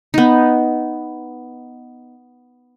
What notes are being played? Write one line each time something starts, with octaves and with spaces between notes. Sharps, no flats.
B3 D#4